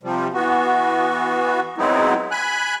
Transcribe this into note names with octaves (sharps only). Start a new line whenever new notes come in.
C3 F3 G3
E3 B3 F#4
F#3 G#3 B3 C4 D#4 E4
G#5 B5 F#6